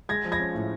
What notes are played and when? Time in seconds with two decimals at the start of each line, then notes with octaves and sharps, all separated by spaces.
0.09 G#3 G#6 A#6
0.25 F3
0.32 G#6 A#6
0.40 C#4
0.54 A2